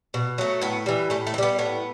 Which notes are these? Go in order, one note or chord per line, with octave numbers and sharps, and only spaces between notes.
B2
F#3 A3
A2 B3
E3 G3
A2 A3
A3
E3
G3 B3
A2 B3